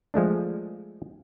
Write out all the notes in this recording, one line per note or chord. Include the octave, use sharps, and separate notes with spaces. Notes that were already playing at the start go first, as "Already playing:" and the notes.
F3 G#3 A3 D4